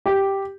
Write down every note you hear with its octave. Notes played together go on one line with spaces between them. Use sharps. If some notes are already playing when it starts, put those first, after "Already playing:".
G4